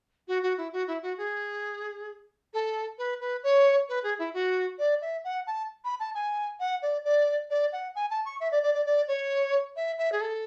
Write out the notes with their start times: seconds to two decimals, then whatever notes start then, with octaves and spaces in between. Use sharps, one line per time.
0.28 F#4
0.43 F#4
0.57 E4
0.73 F#4
0.87 E4
1.02 F#4
1.17 G#4
2.53 A4
2.98 B4
3.20 B4
3.43 C#5
3.89 B4
4.03 G#4
4.19 E4
4.34 F#4
4.79 D5
5.01 E5
5.24 F#5
5.47 A5
5.84 B5
6.00 A5
6.15 G#5
6.59 F#5
6.82 D5
7.04 D5
7.50 D5
7.72 F#5
7.95 G#5
8.10 A5
8.25 C#6
8.40 E5
8.52 D5
8.63 D5
8.74 D5
8.86 D5
9.08 C#5
9.76 E5
9.98 E5
10.12 G#4
10.21 A4